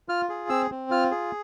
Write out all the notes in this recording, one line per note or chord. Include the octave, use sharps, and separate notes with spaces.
F4 F6
G#4
C4 E6
C4
F4 F6
G#4